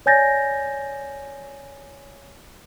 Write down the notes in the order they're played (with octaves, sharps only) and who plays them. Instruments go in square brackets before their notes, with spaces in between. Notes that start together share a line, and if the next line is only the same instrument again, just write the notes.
[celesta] C#5 D5 G#5 G6 A6 A#6